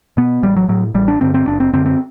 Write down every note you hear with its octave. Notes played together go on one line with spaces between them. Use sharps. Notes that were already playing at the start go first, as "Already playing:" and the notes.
B2 B3
A1 G3
F#3
A2 F#3
A1 G3
D4
G2 D3 C4
C4
F#1 D4
C4
F#2 D3 C4
C4